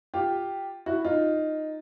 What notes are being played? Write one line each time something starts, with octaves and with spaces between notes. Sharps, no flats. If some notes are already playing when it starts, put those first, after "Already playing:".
F4 G4
E4 F#4
D#4 F4